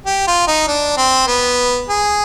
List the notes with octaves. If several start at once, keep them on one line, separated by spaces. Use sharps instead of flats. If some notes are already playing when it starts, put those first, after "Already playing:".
G4
F4
D#4
D4
C4
B3
G#4